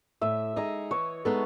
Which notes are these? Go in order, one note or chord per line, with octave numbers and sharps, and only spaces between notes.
A2 E5
G#3 D#4 G#4 D#5
E3 C#5
G#3 B3 D#4 A4